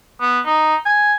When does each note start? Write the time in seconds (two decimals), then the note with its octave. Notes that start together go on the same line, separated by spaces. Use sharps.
0.21 B3
0.46 D#4
0.86 G#5